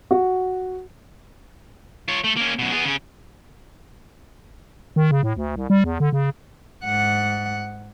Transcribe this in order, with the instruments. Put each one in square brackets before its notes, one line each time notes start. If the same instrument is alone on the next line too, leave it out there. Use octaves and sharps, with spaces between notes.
[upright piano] F#4
[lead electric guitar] F4 C#5
A3
A#3 C#4
F#2 B2
B3 G#4
C#3 C#4
[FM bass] D#3
C#3
A2
D2
C2
G3
E2
D3
C#3
[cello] G#2 F#5